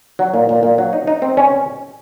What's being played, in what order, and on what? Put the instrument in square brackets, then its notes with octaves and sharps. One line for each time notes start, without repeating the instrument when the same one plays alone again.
[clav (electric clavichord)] F#3
A#2
A#2
A#2
F#3
D#4
D#4
C4
C#4